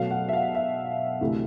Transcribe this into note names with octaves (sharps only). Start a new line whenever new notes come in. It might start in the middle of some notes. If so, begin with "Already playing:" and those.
Already playing: B2 F#3 A3 F5
F#5
E5
F5
E5
D2 C3 E3 A3